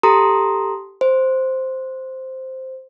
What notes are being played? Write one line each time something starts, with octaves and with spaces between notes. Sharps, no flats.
G4 A4 A#5 C6 D#6
C5